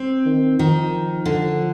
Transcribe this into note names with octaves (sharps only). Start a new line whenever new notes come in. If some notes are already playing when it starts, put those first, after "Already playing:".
Already playing: C4
D#3
D#3 F3
D3